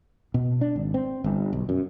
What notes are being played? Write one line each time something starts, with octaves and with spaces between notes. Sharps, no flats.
B2
D4
G#1
C4
G1
B1
F#2